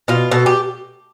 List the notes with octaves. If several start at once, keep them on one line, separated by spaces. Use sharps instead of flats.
B2 F4
B2 A4
G4